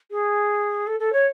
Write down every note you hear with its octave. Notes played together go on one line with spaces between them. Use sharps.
G#4
A4
A4
C#5